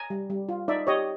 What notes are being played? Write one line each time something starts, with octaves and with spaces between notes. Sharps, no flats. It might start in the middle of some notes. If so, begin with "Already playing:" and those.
Already playing: G#5 A#5
G3
G3
F4
D#4 D5 E5
G4 C#5 D#5